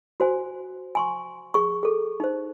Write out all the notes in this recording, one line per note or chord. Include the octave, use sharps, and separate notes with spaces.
F#4 C5 G#5
G#5 C6 C#6
G#4 C#6
G#4 A4
D#4 C5